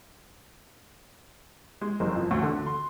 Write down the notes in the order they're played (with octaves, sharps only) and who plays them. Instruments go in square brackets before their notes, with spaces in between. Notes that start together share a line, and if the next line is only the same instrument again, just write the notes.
[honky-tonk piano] G#3
F#1
F2
D2
D3
C6